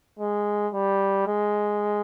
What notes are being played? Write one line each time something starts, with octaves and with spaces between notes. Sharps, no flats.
G#3
G3
G#3